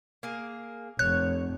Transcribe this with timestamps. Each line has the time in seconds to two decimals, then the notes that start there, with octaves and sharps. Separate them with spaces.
0.23 A#3 G#4
0.99 F1 C#5 F#6